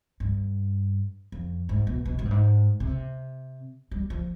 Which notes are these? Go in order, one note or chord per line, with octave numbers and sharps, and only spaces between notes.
G2
F2
G#2
B2
B2
G#2
G2
G#2
C3
G3
F3